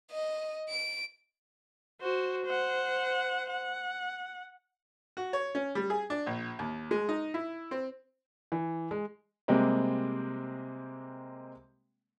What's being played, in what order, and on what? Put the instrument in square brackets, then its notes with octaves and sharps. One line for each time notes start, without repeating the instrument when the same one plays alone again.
[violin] D#5
D7
[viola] F#4 C5
C5 F#5
F#5
[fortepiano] F#4
C#5
C#4
G3
G#4
D4
A#1
D#2
G#3
D#4
E4
C4
[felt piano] E3
G#3
[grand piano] C3 G3 G#3 A#3 C4